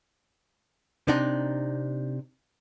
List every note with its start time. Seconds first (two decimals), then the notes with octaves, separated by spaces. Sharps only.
1.08 C3 D4 D#4